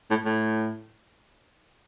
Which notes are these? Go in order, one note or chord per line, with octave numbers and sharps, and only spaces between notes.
A2
A2